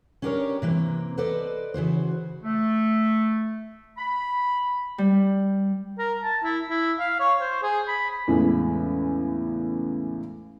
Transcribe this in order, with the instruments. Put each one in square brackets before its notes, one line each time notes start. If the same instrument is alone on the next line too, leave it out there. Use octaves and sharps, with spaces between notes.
[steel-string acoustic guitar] C#4 D4 G4 A4 A#4 C#5
C3 E3 A#3 C4
A4 B4 C5 D5 D#5
C#3 E3 F#4 C5
[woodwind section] A3
B5
[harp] G3
[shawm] A#4
A5
E4
E4
F5
C#5
C5
G#4
B5
[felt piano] E2 A2 C#3 E3 G#3